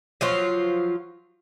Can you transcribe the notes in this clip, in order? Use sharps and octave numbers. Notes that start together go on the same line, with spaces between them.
F3 F#3 F4